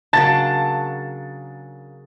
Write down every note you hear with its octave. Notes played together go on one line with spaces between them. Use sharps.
C#3 F#3 A#3 D4 A5 A6